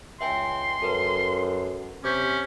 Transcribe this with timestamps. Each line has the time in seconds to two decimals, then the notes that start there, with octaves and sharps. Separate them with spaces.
0.21 C#2 E5 G5 G#5 C6
0.82 F#2 A4 B4
2.04 C3 C#4 D6 G6 B6